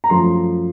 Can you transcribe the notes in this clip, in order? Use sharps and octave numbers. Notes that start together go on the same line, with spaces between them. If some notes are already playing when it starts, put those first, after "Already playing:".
A#5
F#2 F3 A3 C6